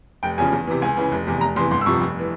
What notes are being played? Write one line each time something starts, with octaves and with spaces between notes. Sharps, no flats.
F1 G5
E2 C#3 F3 G#5
E2
C3 E3
C#2 G#5
C#3 E3
F1
E2 C3
F1 A#5
E2 C3 E3 C6
G1 C6
E6
F2 C3 F3 C#6
F1
E3